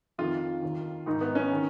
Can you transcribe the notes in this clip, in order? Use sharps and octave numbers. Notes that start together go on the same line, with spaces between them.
F2 D#3 F4
D#2 D#3
G#2 D#3 D#4
B3
C#4
D#3